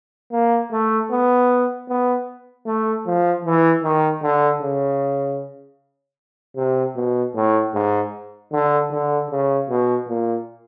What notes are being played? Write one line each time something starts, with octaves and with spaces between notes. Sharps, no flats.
A#3
A3
B3
B3
A3
F3
E3
D#3
D3
C#3
C3
B2
A2
G#2
D3
D3
C#3
B2
A#2